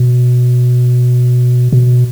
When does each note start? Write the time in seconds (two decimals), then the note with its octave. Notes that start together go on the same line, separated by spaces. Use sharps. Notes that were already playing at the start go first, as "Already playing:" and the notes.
Already playing: B2
1.73 B2